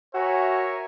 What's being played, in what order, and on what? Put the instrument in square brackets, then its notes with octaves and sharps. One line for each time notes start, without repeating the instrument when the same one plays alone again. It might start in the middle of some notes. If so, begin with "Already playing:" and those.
[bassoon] F#4 [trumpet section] A#4 E5 G#5 [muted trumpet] C#5